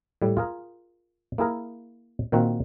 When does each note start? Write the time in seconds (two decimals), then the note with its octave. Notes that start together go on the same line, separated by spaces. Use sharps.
0.22 A2 G3
0.37 F4 G#4 A#4
1.38 A#3 E4 G#4 A#4
2.32 A#2 D#3 A#3 C4 F#4